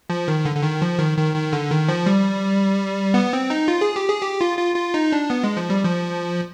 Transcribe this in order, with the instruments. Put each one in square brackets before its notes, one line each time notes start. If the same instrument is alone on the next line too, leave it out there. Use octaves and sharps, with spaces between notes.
[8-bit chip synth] F3
D#3
D3
D3
D#3
F3
D#3
D#3
D#3
D3
D#3
F3
G3
B3
C4
D#4
F4
G#4
G4
G#4
G4
F4
F4
F4
D#4
D4
B3
G#3
F3
G3
F3